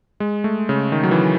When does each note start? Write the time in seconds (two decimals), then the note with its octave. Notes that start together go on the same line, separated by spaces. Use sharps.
0.20 G#3
0.44 A3
0.69 C#3
0.92 D#3
1.03 F#3
1.11 E3